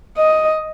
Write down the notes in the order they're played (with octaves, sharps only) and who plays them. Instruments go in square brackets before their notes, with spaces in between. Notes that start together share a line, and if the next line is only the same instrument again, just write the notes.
[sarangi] D#5